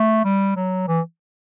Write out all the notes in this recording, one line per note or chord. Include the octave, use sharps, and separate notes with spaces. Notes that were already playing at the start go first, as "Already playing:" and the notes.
Already playing: A3
G3
F#3
E3